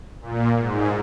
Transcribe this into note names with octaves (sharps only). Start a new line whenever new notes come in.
A#2
G#2